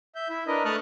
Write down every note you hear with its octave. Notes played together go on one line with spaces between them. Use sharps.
E5 G6
E4 E5
D4 A#4 B4 D#5
A3 A5 C#6 D#6 F6 F#6